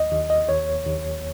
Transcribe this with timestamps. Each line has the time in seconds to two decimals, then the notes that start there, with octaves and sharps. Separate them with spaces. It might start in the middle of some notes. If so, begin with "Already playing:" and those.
Already playing: D#2 D#5
0.11 D#2
0.30 D#5
0.49 D#2 C#5
0.86 D#2